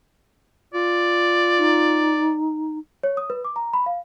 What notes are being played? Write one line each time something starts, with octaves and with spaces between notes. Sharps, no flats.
F4 D5
D#4
C#5
D#6
B4
D6
A#5
B5
F5